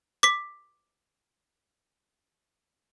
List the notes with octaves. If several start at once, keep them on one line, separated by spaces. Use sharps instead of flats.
D6 B6